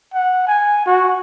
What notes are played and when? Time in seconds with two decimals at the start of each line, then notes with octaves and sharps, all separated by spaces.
0.14 F#5
0.47 G#5
0.86 F#4